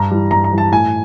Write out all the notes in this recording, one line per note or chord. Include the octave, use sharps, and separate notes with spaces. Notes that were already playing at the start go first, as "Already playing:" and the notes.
Already playing: G2 A#5
E3 G3
G2 A#5
A#5
E3 G3
A5
A2 G#5